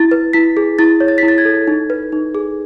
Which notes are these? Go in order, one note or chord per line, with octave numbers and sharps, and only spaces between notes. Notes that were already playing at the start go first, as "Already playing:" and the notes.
Already playing: E4 A6
B4
E4 B6
G#4
E4 A6
C#5
A6
B6
E4
A6
G#6
A4
D#4
B4
D#4
G#4